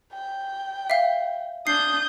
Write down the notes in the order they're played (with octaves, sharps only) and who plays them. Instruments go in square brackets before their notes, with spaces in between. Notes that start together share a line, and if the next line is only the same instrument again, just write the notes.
[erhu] G5
[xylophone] E5 F5
[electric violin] D4 G6 [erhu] D#6 [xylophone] C7